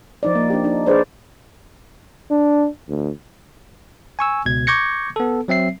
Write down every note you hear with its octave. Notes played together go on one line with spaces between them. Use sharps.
F3 D#4 D5
A#3
D4 G4
D4 D#4
D4 G#4 B4 C5 D5
D4
D2
G#5 C#6 E6
C#2 B2 G#6
C#6 D6 G6 G#6 A#6 C#7
B3 A4
F#3 C4 E5 C7